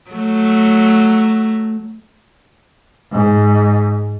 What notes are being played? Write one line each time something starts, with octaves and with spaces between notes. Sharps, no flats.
F#3 A3
G#2